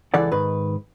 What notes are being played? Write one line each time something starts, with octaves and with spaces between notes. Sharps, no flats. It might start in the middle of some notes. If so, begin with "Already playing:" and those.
C#2 E3 A4 D5 F#5
G#2 D#3 B4